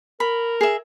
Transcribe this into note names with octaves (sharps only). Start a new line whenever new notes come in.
A#4 B5
G#4 E5